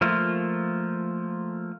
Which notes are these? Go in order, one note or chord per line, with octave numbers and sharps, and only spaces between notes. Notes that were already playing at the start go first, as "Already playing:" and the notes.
F3 A3 A#3 F4